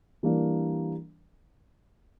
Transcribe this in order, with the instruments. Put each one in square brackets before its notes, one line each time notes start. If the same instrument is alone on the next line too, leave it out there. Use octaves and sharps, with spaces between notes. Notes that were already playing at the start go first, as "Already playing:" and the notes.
[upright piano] E3 G3 A#3 D4